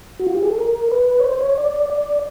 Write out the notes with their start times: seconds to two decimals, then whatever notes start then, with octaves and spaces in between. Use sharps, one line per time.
0.20 F#4
0.27 F4
0.35 G4
0.43 G#4
0.51 A4
0.59 A#4
0.92 B4
1.20 C#5
1.24 C5
1.41 C#5
1.58 D5
1.90 D5